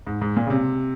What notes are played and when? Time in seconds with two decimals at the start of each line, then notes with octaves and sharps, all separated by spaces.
0.07 G#2
0.21 G#2
0.36 A#2
0.47 C#3
0.50 C3